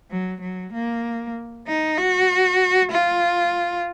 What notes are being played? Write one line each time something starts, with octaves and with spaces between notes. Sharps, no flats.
F#3
F#3
A#3
D#4
F#4
F4